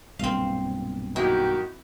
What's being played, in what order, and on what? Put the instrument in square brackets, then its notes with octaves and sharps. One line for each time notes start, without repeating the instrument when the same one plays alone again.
[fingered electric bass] B1 G2 A#2 [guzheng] C4 F5
[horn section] D#3 F#4 G4 [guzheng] E4